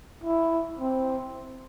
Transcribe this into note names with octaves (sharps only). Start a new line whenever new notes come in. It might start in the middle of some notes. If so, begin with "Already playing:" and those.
E4
C4